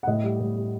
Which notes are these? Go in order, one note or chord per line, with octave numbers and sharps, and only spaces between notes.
F#5
A2 D#5
G3
A2
G3